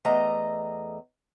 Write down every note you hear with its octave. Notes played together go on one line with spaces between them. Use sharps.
E2 A3 D#5 A#5